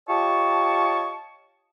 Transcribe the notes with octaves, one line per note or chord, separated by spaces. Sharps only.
F4 G4 C#5 D#5 A5 C#6